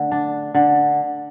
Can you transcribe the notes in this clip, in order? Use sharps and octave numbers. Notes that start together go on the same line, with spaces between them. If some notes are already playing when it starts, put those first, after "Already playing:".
Already playing: D3 A3
D4
D3